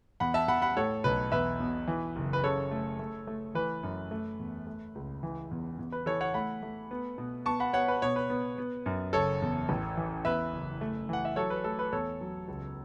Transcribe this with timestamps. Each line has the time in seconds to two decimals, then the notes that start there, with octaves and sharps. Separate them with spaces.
0.20 E2 F#5 B5
0.34 E5 A5
0.48 E2 F#5 B5
0.62 F#5 B5
0.77 A2 A4 C#5
1.04 B1 B4
1.32 E2 B4 E5
1.60 B2
1.87 E3
2.16 F#1
2.33 B4
2.43 C#3 A4 C#5
2.71 A3
2.99 A3
3.27 A3
3.55 E3 B4
3.83 F#2
4.11 A3
4.40 E2
4.67 A3
4.95 C#2
5.23 E3
5.51 E2
5.79 E2
5.92 B4
6.06 E3 A4 C#5
6.21 C#5 F#5
6.34 A3 F#5 B5
6.63 A3
6.91 B3
7.18 B2
7.46 B3 A5 C#6
7.60 F#5 B5
7.73 B3 C#5 F#5
7.88 B4
8.02 B2 C#5
8.16 B4
8.30 B3
8.58 B3
8.86 F#2
9.13 F#1 A4 C#5
9.42 E2
9.69 A1
9.97 E3
10.25 E2 B4 E5
10.52 F#1
10.81 A3
11.09 E3 F#5
11.25 E5
11.36 F#3 A4 C#5
11.50 B4
11.64 A3 A4
11.79 B4
11.92 E2 A4 C#5
12.21 F#3
12.48 C#2